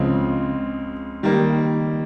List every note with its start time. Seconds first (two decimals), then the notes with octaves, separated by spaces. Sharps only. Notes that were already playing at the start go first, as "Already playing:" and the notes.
Already playing: C#2 C#3 F3 G#3 C4
1.23 D#3 G3 A#3